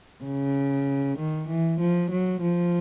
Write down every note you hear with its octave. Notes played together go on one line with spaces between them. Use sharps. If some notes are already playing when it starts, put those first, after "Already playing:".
C#3
D#3
E3
F3
F#3
F3